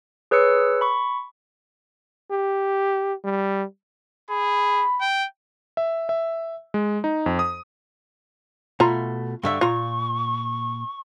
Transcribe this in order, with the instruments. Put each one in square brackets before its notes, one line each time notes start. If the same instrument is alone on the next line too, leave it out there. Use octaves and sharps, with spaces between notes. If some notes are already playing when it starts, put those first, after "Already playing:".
[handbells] G#4 B4 C#5 E6 C#7
B5 C#6
[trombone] G4
G3
[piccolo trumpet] G#4 [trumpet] B5
[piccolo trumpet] G5
[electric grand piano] E5
E5
G#3
D#4
F2
D#6
[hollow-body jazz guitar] B2 A3 [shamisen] F4 A#5
[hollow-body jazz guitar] G2 D3 E5 [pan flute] C#6
[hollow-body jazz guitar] A#2 A#5 [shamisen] F4